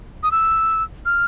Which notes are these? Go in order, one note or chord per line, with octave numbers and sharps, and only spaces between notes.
D#6
E6
F6